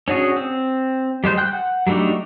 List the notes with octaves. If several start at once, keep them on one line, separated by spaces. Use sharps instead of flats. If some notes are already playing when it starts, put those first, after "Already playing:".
C#4 D4 F#4 G#4
C4
G3 G#3 C5 G6
G5 F#6 G6
F#5
F#3 G3 A3 D4 D#4